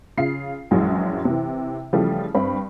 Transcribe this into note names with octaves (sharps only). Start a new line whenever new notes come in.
C#3 F4 C7
A#1 F#2 E3 F#3 G#3
C3 E3
C#3 E3 F3 G3 A3
G2 C4 B5